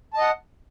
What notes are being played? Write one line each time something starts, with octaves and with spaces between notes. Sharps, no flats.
D#5 F#5 A5